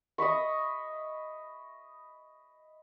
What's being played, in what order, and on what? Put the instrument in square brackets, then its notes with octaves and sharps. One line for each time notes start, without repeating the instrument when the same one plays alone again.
[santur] D#5 E5 B5 C#6